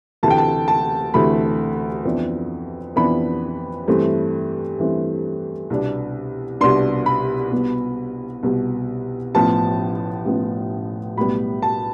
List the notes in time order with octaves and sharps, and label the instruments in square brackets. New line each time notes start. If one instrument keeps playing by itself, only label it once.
[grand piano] D2 C3 E3 A3 A5
G5
A5
A5
D2 C3 E3 A3 B5
F2 E3 B3 D4
F2 E3 B3 D4 B5
G2 E3 A3 C4
G2 E3 A3 C4
C2 B2 B3 D4
C2 B2 B3 D4 C6
B5
C2 B2 B3
C2 B2 B3
A1 A2 F3 B3 A5
A1 A2 F3 B3
B1 A2 G3 B3 B5
A5